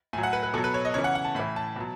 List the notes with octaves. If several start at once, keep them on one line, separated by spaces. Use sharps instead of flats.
A2 F#3 G#5
F#5
B4
B4
B2 F#3 A4
B4
C#5
D#5
C#3 E3 C#5
F#5
F#5
A5
A2 E3 B5
A5
B2 F#3